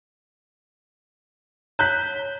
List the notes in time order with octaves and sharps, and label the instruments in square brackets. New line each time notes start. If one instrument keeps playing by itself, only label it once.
[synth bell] C#5 G6 G7 [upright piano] A#5 F#6 B6